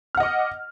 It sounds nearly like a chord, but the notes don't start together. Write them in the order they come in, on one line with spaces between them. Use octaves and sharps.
F6 F#5 D#5 D6